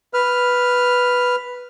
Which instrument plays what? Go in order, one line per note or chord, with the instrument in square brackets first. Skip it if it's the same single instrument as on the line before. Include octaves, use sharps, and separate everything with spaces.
[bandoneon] B4 F6